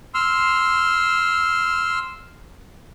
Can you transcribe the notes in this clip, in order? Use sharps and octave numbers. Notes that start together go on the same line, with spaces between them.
C6 E6 F6